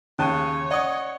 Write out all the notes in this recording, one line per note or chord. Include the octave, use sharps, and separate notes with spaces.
D#2 C#3 C#4 C#5 A5 D#7
D5 D#5 F#5 D#6